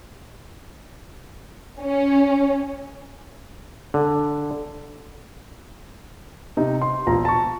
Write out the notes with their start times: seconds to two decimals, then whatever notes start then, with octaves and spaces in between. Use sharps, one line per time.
1.80 C#4
3.94 D3
6.57 C3 D#4
6.82 C6
7.07 E1 A#1 F3 A#5
7.25 A5 C#6